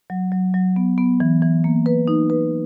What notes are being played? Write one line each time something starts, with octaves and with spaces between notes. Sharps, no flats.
F#3
F#3
F#3
B3
B3
E3
E3
A#3
B4
D#4
B4